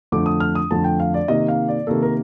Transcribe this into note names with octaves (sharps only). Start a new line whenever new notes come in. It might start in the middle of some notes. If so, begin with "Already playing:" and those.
F2 D3 A3 D6
D#6
F6
D#6
F2 D3 A3 A5
G5
F5
D5
C3 D#3 A#3 D#5
F5
D5
C3 D#3 A#3 A4
A#4